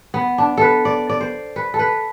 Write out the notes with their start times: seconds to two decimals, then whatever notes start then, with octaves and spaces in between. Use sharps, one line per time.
0.14 B3
0.38 D4
0.57 A4 B4
0.85 D5
1.09 D5
1.21 C5
1.56 B4
1.74 A4
1.79 B4